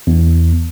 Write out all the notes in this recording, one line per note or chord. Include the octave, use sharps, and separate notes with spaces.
E2